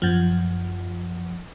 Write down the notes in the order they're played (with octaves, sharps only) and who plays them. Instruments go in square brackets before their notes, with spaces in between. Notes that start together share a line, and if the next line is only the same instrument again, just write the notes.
[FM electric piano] F#2 F3